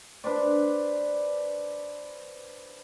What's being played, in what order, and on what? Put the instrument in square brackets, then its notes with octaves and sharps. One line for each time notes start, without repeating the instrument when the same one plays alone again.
[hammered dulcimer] D4 B4 C5 D5